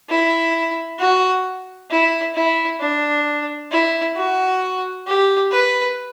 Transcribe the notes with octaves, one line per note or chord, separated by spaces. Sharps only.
E4
F#4
E4
E4
D4
E4
F#4
G4
B4